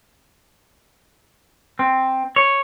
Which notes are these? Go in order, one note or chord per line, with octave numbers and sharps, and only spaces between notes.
C4
C#5